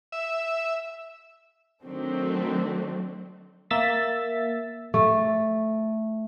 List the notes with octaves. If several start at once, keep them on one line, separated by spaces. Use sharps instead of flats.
E5
D#3 F#3 A3 C4 D4
A#3 E5 E6 A6 B6
A3